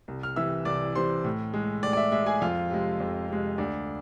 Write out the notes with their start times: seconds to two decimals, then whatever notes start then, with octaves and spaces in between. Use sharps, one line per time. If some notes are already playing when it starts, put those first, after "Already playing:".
0.08 C2
0.23 F6
0.36 C3 E3 E5 E6
0.65 C2 D5 D6
0.95 C3 E3 C5 C6
1.24 A2
1.54 G#3
1.83 A2 D5
1.93 D5
1.97 E5
2.12 G#3 E5
2.26 G#4 G#5
2.41 F2 F4 F5
2.71 C3 G#3
3.00 F2
3.29 C3 G#3
3.58 D2 D5